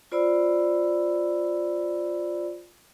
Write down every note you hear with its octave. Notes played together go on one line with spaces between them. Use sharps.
F4 C5 D5 B5 E6